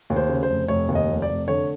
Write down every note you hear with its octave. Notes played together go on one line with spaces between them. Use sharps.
D#2
C5
C#3
C5
F1
F1 C#5
D#2
D#5
F1
D5
F1
D3 C#5